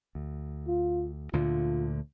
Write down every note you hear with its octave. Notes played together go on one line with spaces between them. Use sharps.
D2
F4
D2 A#2 D3 F4